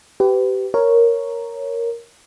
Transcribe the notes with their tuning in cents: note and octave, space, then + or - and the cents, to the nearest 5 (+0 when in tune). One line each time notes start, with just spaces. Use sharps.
G4 -20 B4 +30
A#4 +0 C#5 +0